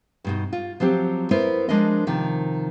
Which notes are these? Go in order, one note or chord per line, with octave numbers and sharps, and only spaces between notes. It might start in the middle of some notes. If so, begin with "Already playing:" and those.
G2 B2 D#4
F4
F3 F#3 C4 G4
B3 E4 A#4 C5
F3 G#3 D4 A#4 D#5
C3 D#3 F3